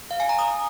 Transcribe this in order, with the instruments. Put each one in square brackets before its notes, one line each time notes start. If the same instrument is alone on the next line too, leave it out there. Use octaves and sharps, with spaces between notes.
[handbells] F5
G#5
A#5
D#6